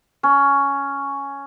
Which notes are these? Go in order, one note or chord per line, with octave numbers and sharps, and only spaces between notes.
C#4